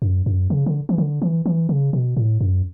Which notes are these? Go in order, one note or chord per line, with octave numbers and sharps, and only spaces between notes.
F#2
F#2
C#3
D3
E3
D3
E3
E3
C#3
B2
A2
F#2